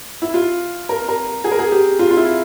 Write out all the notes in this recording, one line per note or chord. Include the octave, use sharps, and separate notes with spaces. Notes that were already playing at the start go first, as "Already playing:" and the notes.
E4
F4
A#4
A#4
G#4
A#4
G#4
G4
F4
F4
E4